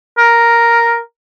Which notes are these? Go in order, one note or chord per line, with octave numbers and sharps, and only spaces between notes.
A#4